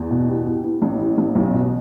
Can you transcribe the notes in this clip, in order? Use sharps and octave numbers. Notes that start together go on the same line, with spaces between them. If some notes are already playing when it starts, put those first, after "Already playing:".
Already playing: E2
B2
E3 G4
E3
E3
A1
E3
A1
B1
B2